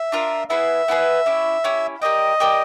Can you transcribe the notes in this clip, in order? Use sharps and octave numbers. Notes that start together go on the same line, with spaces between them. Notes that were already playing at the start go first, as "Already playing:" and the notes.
Already playing: E5
D4 F4 A#4
B3 E4 G#4 B4 E5
B3 E4 G#4 B4
C#4 E4 G4
C#4 E4 G4
G4 A#4 D5 D#5 G5
G4 A#4 D5 G5